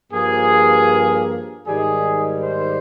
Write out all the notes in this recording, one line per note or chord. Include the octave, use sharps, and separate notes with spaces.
G2 F3 A#3 G#4
G#2 D#3 G3 G#4
C5